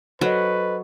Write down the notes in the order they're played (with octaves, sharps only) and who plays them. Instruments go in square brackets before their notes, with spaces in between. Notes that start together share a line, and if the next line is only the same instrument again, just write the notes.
[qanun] F#3 [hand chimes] A4 C5 D#5 [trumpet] B4